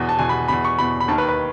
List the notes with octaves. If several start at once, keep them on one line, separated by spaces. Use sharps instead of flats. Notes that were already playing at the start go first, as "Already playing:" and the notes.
Already playing: E2 B2
A5
E2 B2 G#5
B5
E2 B2 B5
C#6
E2 B2 B5
B5
D#2 D#3 A5
B4
B4